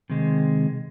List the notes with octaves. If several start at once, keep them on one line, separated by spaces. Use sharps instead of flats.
C3 D#3 G#3